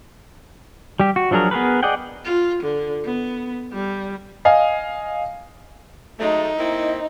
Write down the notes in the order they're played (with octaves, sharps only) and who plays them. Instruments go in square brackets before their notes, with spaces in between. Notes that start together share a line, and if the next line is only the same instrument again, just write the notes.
[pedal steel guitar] G3 G4
F#4
F3 F#3 D4 G#4 A#4
B3 G#4 A#4 B4
G#4 D5 D#5 F#5 G5
[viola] F4
D3
B3
G3
[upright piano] D#5 F5 G#5
[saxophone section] F#3 G#3 A3 [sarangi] D#4
[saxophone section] A#3 C4 E4